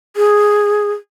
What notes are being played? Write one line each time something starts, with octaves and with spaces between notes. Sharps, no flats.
G#4